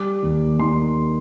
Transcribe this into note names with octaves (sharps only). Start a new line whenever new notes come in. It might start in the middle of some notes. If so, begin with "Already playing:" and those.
Already playing: G3 D6
D#2
D#3 C6